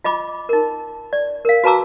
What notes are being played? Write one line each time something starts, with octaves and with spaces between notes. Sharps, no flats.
F4 D#5 B5 D6
D#4 A#4
D5
A#4 F5
F#4 B4 A5 A#5 D6 E6